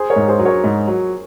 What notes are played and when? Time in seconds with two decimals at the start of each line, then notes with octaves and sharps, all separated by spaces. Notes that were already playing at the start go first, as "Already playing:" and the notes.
Already playing: G#4 C5
0.10 A#4 C#5
0.16 G#2
0.28 G#4 C5
0.39 F#3
0.45 A#4 C#5
0.64 G#2
0.88 F#3